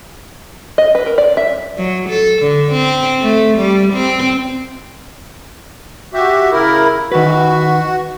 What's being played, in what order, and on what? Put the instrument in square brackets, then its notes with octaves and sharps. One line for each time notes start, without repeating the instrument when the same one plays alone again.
[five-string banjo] D#5
B4
A#4
D5
E5
[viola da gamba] F#3
A4
D3
C4
A3
G3
C4
[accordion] F#4 G4 E5
C#3 E4 A#4
[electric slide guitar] D#3 B4 [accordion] F#4